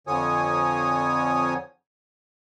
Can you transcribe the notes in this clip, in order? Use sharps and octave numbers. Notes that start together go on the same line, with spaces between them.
F2 D3 F3 C#5 G#5 D#6